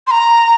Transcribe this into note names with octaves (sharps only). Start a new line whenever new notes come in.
C6
A#5